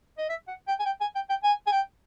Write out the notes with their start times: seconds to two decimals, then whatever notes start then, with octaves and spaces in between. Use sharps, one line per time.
0.18 D#5
0.29 E5
0.48 F#5
0.68 G5
0.79 G#5
0.86 G5
1.01 G#5
1.15 G5
1.29 G5
1.43 G#5
1.67 G#5
1.71 G5